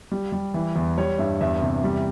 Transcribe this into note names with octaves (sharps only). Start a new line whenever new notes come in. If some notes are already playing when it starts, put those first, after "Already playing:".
G3
G3
E3
E2
G3 C#5
G2 E5
E2 E5
C3
G3